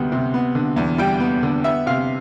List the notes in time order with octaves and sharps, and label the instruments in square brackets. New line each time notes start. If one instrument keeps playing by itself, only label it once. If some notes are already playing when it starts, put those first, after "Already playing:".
Already playing: [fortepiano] D2 C3 G3 B3
C3
B3
D3
E2
G3 G5
B3
D3
B3 E5
C3 F5